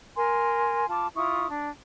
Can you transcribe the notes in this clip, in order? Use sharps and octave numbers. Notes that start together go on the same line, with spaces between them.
A#4 G#5 C6
F4 A5 D6
E4 F4 C#6 D#6
D4